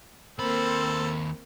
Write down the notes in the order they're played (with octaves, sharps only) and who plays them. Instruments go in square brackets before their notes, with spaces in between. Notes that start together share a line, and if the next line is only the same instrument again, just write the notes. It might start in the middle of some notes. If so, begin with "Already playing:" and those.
[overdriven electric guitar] D#2 B5 [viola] A#3 C4 [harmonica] A4 C5